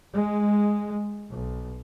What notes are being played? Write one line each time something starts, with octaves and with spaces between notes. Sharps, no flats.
G#3
B1